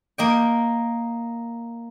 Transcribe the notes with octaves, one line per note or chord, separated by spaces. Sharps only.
A#3 D#5 G5